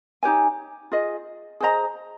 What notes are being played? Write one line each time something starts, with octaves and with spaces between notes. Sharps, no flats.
D#4 G4 C#5 G#5
F4 G#4 D#5
G#4 C5 D#5 A#5